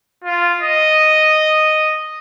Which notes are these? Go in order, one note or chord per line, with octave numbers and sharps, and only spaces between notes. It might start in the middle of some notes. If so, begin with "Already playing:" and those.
F4
D#5